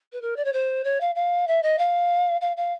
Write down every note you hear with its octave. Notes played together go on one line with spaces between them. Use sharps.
B4
A#4
D5
C#5
C5
C#5
F5
F5
E5
D#5
F5
F5
F5